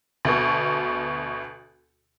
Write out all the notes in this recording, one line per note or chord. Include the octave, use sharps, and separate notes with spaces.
D2 B2